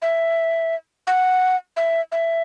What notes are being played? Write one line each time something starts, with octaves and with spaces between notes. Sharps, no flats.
E5
F#5
E5
E5